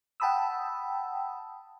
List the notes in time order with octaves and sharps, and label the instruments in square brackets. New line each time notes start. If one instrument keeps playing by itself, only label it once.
[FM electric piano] F#5 G5 A5 B5 D#6 E6